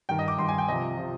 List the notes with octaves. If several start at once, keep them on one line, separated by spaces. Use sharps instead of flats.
G2 D#3 G5
D#5
D6
G2 D#3 C6
G#5
G5
C2 C3 F3 D#5
C3 F3